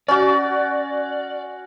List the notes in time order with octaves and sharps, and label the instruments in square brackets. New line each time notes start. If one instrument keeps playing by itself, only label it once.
[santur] C#4 F#4 [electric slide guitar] D5